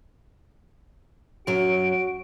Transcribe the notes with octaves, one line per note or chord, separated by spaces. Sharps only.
F#2 F#3 F#4 D7